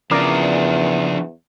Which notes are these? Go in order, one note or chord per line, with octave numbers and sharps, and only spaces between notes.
E2 C#3 F3 D4 A#4 D5